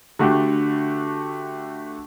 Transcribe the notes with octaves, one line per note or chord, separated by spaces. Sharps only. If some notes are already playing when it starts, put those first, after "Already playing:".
D3 A3 F#4 G4